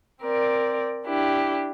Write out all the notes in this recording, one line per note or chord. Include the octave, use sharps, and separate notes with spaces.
C4 A#4 D5
D4 E4 G4